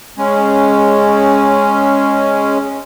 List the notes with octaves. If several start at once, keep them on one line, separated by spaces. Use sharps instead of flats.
G#3 C#4